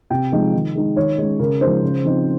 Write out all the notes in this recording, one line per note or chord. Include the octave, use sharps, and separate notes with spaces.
C3 G5
F3 G#3 D#4
D#3
G#3 D#4
D#3 C#5
G#3 C#4
C#3 A#4
F3 G#3 D#4 C5
C#3
F3 C4 D#4